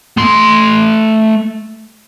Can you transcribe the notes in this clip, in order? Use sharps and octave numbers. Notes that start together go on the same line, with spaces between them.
A3 C6